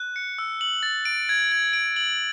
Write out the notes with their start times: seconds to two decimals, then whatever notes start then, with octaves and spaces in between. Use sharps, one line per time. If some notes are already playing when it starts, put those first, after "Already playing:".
Already playing: F#6
0.16 C#7
0.38 E6
0.61 F#7
0.83 A6
1.05 D7
1.29 G#6
1.52 G#6
1.73 D7
1.96 F#7